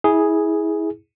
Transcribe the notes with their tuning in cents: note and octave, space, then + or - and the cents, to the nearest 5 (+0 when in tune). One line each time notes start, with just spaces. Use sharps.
E4 -25 G#4 +0